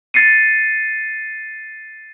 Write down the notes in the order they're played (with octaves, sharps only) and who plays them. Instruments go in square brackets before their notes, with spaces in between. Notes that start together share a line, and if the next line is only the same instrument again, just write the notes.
[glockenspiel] A6 C7 C#7 D#7